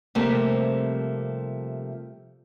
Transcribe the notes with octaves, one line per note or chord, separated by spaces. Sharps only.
C3 F3 G3 A3 A#3 C4